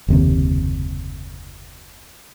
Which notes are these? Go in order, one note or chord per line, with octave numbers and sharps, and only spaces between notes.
F#1 D#2 C3